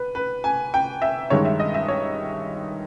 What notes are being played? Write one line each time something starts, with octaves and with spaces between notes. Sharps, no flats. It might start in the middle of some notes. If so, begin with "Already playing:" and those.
Already playing: B4
B4
G#5
G5
E5
G2 D#3 G#3 C#5
E5
D#5
E5
C#5